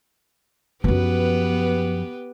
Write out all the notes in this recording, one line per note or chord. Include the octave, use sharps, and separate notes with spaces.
F#2 F3 B3 G4 B4